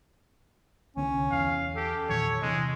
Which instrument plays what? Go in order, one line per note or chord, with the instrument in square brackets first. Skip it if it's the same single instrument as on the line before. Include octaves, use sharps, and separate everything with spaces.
[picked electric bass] C2 D3 B3 [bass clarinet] C#4
[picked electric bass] E2 [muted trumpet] F5
[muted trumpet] G4 [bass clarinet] A4
[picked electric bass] E2 A#2 D#3 [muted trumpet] C#5
[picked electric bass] C3 E3 C4 [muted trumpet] G#3